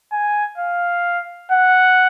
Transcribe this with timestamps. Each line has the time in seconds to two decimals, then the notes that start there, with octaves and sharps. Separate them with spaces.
0.12 G#5
0.58 F5
1.52 F#5